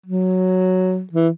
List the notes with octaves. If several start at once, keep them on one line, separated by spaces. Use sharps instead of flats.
F#3
E3